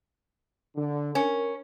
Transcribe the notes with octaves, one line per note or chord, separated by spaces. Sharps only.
D3
C#4 A#4